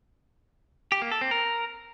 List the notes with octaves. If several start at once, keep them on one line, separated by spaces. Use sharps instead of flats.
G4
A#3
A4
C4
A#4